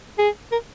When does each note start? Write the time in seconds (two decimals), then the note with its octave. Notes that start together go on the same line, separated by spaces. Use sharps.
0.18 G#4
0.52 A#4